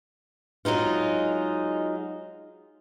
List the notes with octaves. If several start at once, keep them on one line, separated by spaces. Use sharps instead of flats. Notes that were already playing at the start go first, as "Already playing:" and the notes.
F#3 G#3 D#4 F4